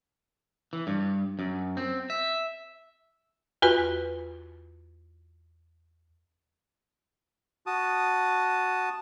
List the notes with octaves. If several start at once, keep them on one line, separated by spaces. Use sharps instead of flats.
E3
G2
F#2
C4
E5
E2 F4 F#4 B4
F#4 A5 D#6